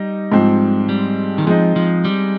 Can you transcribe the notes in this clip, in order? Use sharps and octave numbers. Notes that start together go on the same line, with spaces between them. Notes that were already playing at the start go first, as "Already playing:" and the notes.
Already playing: G3 D#4
G#2 F3 G#3 C4
G3
D#3
F3 G#3 C4 D#4
F3
G3